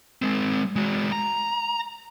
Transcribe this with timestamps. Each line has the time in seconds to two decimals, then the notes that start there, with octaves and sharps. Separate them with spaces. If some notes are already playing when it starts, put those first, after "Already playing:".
0.22 G#3 C4
0.76 G#3 F#4
1.12 A#5